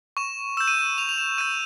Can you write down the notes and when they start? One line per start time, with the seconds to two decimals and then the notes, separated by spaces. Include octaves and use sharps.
0.17 C#6 E7
0.57 E6 G6 E7
0.68 D#7
0.79 E7
0.98 C#6 F7
1.09 F7
1.18 E7
1.38 E6 G6 D#7